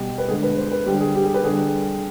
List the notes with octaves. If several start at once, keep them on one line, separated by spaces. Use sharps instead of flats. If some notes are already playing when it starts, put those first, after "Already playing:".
Already playing: B2 G3 G4
B4
D3 G#3 G#4
B4
C5
B4
D3 G3 G4
G#4
G4
G#4
B4
D3 G3 G#4